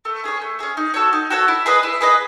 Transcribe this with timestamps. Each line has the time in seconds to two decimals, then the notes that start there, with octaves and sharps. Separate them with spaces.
0.05 A3
0.24 C#4 G#4 C#5
0.42 A3
0.59 C#4 G#4 C#5
0.77 D#4
0.94 F#4 A4 C#5
1.13 D#4
1.30 F#4 A4 C#5
1.48 E4
1.66 G#4 B4 D#5
1.83 E4
2.01 G#4 B4 D#5